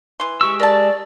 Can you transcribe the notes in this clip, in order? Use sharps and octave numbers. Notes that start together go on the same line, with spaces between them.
E3 C6
G#3 G4 C#6 E6
A#4 D5 A5